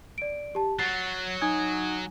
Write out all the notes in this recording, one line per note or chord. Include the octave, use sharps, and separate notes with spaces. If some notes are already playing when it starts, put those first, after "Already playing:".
D5 D7
G4 A5
F#3 A6 C7
D#4 G#5 D#6 G#6